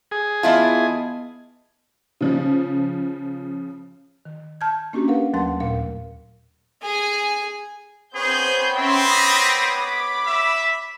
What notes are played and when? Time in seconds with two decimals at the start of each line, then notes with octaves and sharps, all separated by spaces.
0.11 G#4
0.43 E3 B3 E4 F4 D#5 A5
2.21 C#3 F3 C#4
4.25 D#3
4.61 A5 F6 G6 G#6
4.93 A#3 C#4 D4 F#4 G4
5.08 A#4 B4 F5 F#5
5.33 D#2 F#3 A3 F#5 C6
5.60 D#2 A#2 A#4 F5
6.82 G#4 G#5
8.15 B3 C4 G#4 B4 C#5 G6
8.76 C4 C#4 E5 G5 C6
9.07 B5 D6 D#6 A#6
9.78 B5 D6
10.27 E5